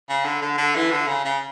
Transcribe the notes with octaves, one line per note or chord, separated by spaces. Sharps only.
C#3
D3
D3
D3
E3
D3
C#3
C#3